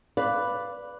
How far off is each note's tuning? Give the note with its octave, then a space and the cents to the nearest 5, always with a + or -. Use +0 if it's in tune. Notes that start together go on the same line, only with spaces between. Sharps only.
B4 +0 D5 +0 F5 +0